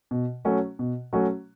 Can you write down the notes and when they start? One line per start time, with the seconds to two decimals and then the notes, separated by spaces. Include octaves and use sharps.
0.11 B2
0.45 F#3 A3 C#4 F#4
0.79 B2
1.13 F#3 A3 C#4 F#4